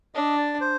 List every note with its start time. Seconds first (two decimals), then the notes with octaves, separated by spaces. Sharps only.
0.15 D4 D#5
0.37 D5
0.61 C5